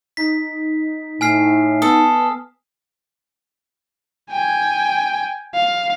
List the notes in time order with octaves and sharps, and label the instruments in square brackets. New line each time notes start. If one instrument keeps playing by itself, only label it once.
[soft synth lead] D#4 [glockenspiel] B6
[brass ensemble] A2 [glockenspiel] G#5 F6 C7
[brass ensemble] B3 [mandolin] A4 [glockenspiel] D#6
[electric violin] G5 G#5
F5